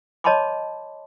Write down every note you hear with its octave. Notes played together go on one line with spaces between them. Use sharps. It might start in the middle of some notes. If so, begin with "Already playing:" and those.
C#5 D#5 A5 B5 C6 D6